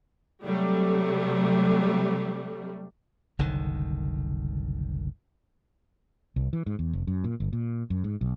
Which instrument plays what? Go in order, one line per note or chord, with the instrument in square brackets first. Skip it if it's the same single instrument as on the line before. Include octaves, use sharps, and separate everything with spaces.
[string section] C3 F#3 G3 A3
[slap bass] F#1 C2 D3 D#3
[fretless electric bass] C2
E3
G#2
E2
F1
F#2
A#2
G1
A#2
F#2
G#2
B1